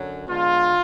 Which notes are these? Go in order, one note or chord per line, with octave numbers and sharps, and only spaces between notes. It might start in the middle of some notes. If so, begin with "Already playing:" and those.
Already playing: F#2 D3 F#3
D3 G#3 B3 F4